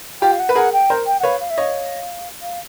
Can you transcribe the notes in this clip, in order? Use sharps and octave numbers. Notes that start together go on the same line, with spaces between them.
F4 G4 G5
F5
F#5
B4
G#4 A#4 F#5
G5
A#4 C5
G5
F#5
B4 C#5 F5
F5
E5
C#5 D#5 F5
F5